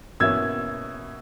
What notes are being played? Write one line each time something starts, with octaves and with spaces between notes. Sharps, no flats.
B2 A#3 C#4 E4 E6 G#6